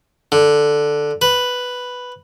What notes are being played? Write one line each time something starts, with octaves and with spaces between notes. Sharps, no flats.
D3
B4